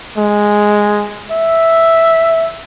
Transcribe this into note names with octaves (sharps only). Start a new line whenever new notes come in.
G#3
E5